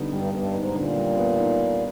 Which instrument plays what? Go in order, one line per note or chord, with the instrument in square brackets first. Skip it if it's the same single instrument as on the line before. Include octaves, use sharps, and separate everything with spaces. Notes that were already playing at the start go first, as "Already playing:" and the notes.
Already playing: [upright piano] D3 G3 B3 D#4
[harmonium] G2 [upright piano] G3
[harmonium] G2 [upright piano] B3
[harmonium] G#2 [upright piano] D#4
[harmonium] A#2 [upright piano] D3
[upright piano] G3
B3
D#4